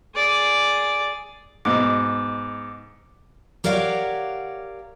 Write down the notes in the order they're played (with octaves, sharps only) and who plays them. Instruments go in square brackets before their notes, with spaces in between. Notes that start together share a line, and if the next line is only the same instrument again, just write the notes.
[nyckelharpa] G#4 D5
[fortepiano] G#2 B2 [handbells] D6
[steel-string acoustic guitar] G4 A#4 C#5 D5 F5 F#5